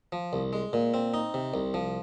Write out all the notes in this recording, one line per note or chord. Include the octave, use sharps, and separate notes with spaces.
F3
C2
G#3
A#2
C4
D#4
C3
C2
F3